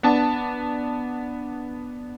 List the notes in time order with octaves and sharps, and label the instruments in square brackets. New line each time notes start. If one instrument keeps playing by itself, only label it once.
[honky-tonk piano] B3 D4 A5